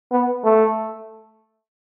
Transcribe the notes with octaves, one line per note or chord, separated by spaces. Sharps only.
B3
A3